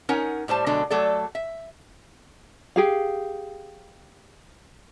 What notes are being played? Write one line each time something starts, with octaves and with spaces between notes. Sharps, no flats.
C#4 D#4 A#4 C#5 F#5 G#5
A2 G3 C5 A5
B2 D3 F#3 G#3 D4 A4
F#3 A3 A4 D5
E5
G4 G#4 F5